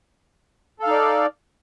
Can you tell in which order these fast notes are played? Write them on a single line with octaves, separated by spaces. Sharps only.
A4 F5 D#4 D5